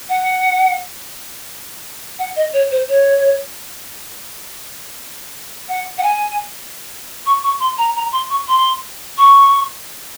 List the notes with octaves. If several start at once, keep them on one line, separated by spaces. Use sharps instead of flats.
F#5
F#5
D#5
C#5
C5
C#5
F#5
F#5
G#5
C#6
C#6
C6
A#5
A#5
C6
C#6
C6
C#6